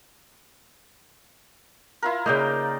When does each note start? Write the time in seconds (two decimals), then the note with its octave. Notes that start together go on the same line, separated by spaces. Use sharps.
2.02 E4 F4 A#4
2.26 C#3 A#3 D#4 D5 G5